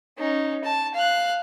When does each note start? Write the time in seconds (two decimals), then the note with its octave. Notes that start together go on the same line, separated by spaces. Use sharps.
0.18 C#4 D#4
0.64 A5
0.94 F5 F#6